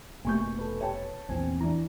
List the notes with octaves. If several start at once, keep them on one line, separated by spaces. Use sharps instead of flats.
F1 B2 A3 A#3 G#5 C#6 G6
A4 B4
C#5 G5 A5
A#1 E2 C4 G#5
E3 D4 A#5